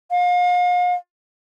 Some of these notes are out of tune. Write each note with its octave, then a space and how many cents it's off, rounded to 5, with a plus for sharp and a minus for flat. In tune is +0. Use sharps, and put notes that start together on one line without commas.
F5 +40